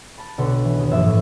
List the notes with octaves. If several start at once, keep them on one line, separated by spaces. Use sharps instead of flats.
A5 B5
B1 D3 B4 C#7
E3
D#2
G1 F3 A#3 E5 G#6
A2